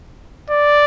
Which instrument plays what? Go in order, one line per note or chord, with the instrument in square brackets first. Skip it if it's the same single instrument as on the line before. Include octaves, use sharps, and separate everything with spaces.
[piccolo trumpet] D5